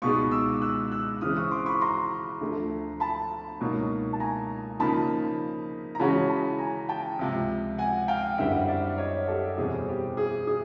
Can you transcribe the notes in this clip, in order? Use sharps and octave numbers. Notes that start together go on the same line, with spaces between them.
C#2 B2 G#3 B3 D#4 C#6 D#6
D6 E6
E6 F#6
E6 F#6
C#3 E3 G#3 C4 D#6 F6
C#6 D#6
C6 D6
B5 C#6
A#5 C6
D2 D3 F3 A3
A5 B5
C#2 B2 F#3 A#3 D#4
A5
G#5 A#5
C#3 F3 A#3 D#4 A5 B5
A#5
C#3 E3 G#3 C#4 F#4 A5 B5
A5 B5
G#5 A#5
G5 A5
C#2 C3 F3
F#5 G#5
F5 G5
F5
F#2 D3 G3 C4 E4 E5 F#5
D5 E5
C#5 D#5
G4 A4
E2 B2 G3 C4 G#4
G4
G#4
G#4